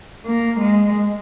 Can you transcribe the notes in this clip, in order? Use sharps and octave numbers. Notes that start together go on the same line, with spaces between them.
A#3
G#3